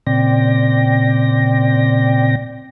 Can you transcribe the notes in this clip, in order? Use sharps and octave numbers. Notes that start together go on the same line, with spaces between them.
A#2 C#3 C4 D5 G5 A#6